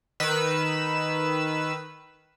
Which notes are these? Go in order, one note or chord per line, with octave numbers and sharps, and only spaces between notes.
D#3 B4 E6